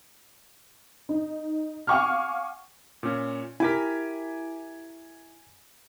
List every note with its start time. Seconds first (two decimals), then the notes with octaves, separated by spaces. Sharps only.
1.09 D#4
1.87 F5 F#5 G#5 C#6 D6 F6
3.03 A#2 C#4
3.60 E4 G4 A#4 G#5 B6